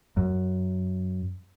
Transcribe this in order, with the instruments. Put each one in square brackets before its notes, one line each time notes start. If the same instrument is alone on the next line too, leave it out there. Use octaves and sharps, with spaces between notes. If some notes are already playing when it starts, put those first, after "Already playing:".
[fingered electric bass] F#2